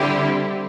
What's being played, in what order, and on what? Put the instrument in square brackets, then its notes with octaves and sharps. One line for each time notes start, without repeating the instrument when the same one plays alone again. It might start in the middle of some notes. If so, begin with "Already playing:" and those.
Already playing: [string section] D3 G3 C4 E4 G4